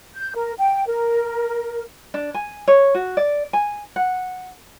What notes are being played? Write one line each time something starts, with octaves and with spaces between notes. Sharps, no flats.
G6
A#4
G5
A#4
D4
G#5
C#5
F#4
D5
G#5
F#5